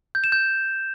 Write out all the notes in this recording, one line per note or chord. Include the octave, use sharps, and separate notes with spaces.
G6
E7
G6